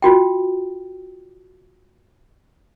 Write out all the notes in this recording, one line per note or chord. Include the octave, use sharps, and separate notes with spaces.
F4 F#4 G5